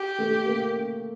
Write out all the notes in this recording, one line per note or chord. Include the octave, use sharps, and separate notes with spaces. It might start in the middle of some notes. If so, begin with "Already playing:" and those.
Already playing: G4
A3
A#3